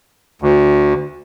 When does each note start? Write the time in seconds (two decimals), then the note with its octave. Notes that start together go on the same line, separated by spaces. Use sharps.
0.42 D2